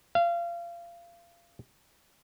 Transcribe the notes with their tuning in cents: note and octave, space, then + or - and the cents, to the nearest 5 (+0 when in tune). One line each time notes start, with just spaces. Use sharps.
F5 -30